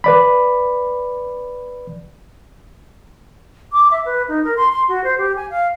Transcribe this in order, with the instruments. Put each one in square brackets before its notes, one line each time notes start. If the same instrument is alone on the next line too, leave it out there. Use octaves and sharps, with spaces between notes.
[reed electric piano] B4 D5 B5
[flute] D6
E5
B4
D#4
A#4
C6
C6
F#4
C5
G4
G#5
F5